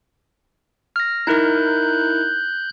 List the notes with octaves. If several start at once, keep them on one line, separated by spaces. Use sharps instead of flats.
F6 A#6
D#4 E4 A#4 F#6 G6